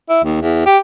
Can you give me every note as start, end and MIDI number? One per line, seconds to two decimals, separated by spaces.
0.09 0.22 64
0.25 0.40 39
0.41 0.63 40
0.66 0.78 67